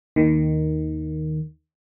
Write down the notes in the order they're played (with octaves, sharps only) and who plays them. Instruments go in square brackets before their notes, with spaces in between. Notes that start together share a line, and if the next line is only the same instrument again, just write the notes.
[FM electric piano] D#2 D#3